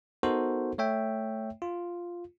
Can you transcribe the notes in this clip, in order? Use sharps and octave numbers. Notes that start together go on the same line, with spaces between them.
B3 D#4 F#4 A4 A#4 C5
A3 C#5 E5 G5
F4